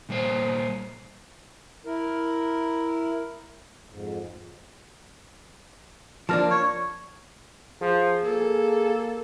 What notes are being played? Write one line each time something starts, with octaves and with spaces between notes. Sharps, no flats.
A#2 G3 A#3 C5 C#5
E4 A#4
F2 G#2
F3 A#3 D4 A5 F6 A#6
C#5
F3 G#4
A#3 A4